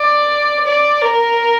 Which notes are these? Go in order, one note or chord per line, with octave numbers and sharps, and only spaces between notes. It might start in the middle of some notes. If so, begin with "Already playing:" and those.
Already playing: D5
D5
A#4